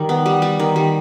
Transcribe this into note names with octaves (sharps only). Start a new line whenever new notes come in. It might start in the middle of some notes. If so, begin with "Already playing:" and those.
Already playing: D#3 G3
B3
G3
G3
D#3
G3